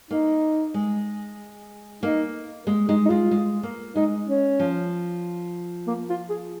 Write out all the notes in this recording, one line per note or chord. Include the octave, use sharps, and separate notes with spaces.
A#3 D#4
G#3
A#3 D#4
G#3 A#3
G#3 D#4
D#4
G#3 F4
G#3
A#3
G#3 D#4
C#4
F3
A#3
F4
G#4